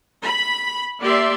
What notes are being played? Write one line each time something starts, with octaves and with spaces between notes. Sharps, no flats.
B5
A#3 G4 D5 E5 C6